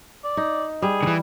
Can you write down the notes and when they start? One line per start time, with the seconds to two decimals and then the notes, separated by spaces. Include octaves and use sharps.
0.24 D5
0.37 D#4
0.82 G3 G#4
1.03 D3 E3